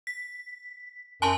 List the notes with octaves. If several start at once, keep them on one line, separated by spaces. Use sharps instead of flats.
B6
F#2 G#5 A5 C6